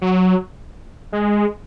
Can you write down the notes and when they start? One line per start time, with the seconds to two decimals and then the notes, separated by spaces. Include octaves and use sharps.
0.02 F#3
1.13 G#3